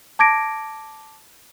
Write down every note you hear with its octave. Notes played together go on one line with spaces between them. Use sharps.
A5 D6 G#6 A#6 D7